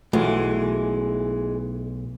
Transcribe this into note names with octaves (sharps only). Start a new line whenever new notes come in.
B1 E3 G#3 A3 F4